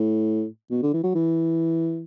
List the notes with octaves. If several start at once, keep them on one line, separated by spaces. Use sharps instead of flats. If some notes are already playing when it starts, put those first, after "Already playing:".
Already playing: A2
B2
D3
E3
F#3
E3